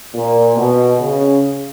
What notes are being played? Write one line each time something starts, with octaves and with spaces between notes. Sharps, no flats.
A#2
B2
C#3